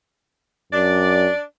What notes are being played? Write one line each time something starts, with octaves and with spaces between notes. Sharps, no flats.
F#2 D4 D5